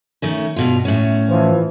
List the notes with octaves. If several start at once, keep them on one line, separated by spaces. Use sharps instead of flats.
D#3 A3 C#4
G2 B2 F4
A2 C#4
E3 F3